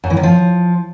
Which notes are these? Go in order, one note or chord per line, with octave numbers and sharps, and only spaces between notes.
F#2
E3
D#3
F3